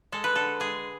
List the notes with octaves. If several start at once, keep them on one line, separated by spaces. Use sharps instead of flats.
G#3 A4
B4
D3 A4
G#3 G#4